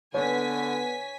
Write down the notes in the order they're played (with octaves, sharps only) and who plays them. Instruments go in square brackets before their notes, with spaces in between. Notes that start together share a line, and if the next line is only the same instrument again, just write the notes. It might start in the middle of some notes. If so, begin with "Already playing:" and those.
[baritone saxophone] D3 [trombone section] B3 [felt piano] C#5 [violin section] G#5 B6